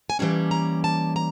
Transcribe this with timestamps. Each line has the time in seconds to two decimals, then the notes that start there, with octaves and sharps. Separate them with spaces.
0.10 G#5
0.19 E3 G3 A#3 C#4 A5
0.51 A#5
0.84 A5
1.16 A#5